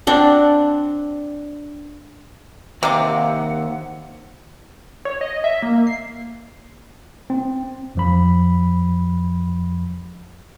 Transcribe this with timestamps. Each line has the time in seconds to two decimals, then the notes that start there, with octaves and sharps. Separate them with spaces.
0.07 C4 D4 F#5
2.83 D#2 C3 C4 F#5 D6
5.05 C#5
5.21 D#5
5.44 E5
5.62 A#3
5.87 C7
7.30 C4
7.95 F2 F3 B5